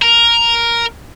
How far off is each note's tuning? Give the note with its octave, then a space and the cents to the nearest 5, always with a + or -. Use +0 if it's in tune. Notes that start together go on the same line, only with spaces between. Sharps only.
A#4 +5